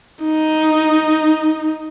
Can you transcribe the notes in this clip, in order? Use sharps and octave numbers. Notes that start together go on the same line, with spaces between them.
D#4